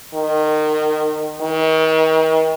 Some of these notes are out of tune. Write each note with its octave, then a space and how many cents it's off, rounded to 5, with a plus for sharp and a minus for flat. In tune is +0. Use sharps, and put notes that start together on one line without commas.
D#3 -25
D#3 +40